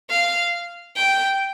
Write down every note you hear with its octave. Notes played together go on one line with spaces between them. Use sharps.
F5
G5